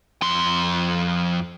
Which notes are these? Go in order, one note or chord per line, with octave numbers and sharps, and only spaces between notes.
F2 C6